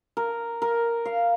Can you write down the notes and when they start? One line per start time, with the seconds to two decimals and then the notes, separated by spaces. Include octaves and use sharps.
0.17 A#4
0.62 A#4
1.05 F5